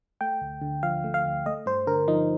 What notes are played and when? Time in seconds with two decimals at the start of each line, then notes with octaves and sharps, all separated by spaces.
0.21 A3 G5
0.41 D2
0.62 D3
0.83 F3 F5
1.04 A3
1.14 F5
1.25 D2
1.46 A3 D#5
1.66 G2 C5
1.87 D3 A#4
2.08 F3 D#4